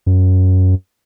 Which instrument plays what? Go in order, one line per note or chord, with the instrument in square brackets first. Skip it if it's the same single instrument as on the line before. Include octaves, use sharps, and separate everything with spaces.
[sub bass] F#2